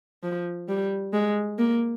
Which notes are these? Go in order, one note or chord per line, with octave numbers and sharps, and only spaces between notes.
F3
G3
G#3
A#3